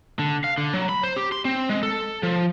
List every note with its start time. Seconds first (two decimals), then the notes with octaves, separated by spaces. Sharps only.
0.19 D3
0.44 F5
0.58 D3
0.74 F#3
0.89 B5
1.03 C5
1.16 G4
1.32 C6
1.45 C4
1.69 G#3
1.83 A4
2.23 F3